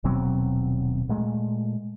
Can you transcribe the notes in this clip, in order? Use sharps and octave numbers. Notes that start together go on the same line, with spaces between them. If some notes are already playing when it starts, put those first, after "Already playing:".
D#1 B2 F#3 C4
A#2 G#3 A3